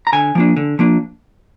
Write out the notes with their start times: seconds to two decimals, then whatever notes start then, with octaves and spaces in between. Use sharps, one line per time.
0.07 A#5
0.13 D3 G#5
0.35 F3 A#3 D4
0.57 D3
0.79 F3 A#3 D4